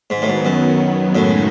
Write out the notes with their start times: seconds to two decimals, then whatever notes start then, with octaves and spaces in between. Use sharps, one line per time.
0.10 G#2 D#3 F#3 B3
0.22 A2
0.28 G#2
0.45 F#2
1.14 F#2 A2 C#3 G#3 D#4 F#4